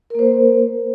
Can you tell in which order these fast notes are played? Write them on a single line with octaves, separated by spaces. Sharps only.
A#4 A#3 C5